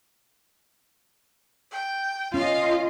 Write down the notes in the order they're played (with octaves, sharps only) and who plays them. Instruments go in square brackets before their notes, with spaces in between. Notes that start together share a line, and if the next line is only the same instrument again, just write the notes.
[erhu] G5
[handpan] C#4 [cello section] F4 D#5 [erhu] F5